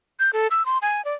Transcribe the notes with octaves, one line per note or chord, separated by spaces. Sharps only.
G6
A4
E6
C6
G#5
D5